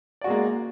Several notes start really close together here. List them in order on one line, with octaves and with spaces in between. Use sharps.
D5 F#4 G#3 A#3